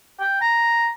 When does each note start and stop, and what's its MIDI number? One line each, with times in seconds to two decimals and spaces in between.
0.20 0.38 79
0.41 0.88 82